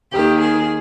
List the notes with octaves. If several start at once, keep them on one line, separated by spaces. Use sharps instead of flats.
D#2 D#3 G4
G#4